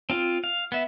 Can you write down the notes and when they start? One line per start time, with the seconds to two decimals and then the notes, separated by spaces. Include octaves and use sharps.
0.10 C4 F4
0.44 F5
0.72 B3 E5